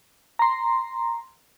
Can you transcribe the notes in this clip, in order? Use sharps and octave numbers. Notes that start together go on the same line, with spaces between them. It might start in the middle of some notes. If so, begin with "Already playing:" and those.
A#5 C6